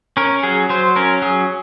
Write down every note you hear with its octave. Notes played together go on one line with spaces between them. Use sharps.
C#4 A#4
F#3 G#4
F#3 C5
C#4 A#4
F#3 G#4